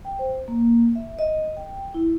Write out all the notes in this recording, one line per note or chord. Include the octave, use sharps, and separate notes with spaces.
G5
C5
A#3
E5
D#5
G5
E4